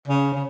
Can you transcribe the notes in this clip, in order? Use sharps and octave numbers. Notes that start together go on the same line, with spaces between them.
C#3
C#3